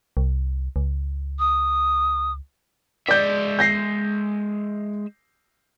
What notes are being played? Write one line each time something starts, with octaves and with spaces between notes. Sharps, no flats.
C2
C#2
D#6
G#3 D5 E5 G6
G6 A#6 C7